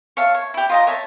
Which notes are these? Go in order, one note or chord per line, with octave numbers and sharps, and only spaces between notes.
C#5 E5 F5 A5
C#5
E4 G4
F4 D#5 A#5
C#5 E5 A5